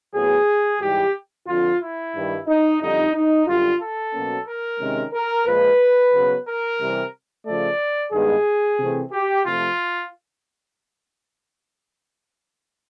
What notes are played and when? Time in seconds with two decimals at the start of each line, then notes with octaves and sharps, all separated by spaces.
0.15 A2 F#3 B3 G#4
0.81 G#2 E3 G3 G4
1.47 F2 D3 F3 F4
1.81 E4
2.14 G2 D#3 G3
2.47 D#4
2.81 F2 D3 G3 D#4
3.14 D#4
3.47 F#2 D3 G3 F4
3.80 A4
4.13 B2 F#3 A#3 C#4
4.46 A#4
4.80 C3 D#3 G#3 C#4
5.14 A#4
5.46 A#2 F3 G#3 B4
6.12 C#3 F#3 B3
6.46 A#4
6.80 C3 E3 G3 C4
7.46 C#3 F3 A3 D5
8.12 G2 D#3 G#3 B3 G#4
8.79 C3 E3 A3 C4
9.12 G4
9.45 C3 F3 A3 F4